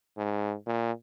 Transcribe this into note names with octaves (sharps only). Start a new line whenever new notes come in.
G#2
A#2